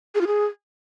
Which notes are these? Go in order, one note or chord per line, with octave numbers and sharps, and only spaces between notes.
G#4
F4
G#4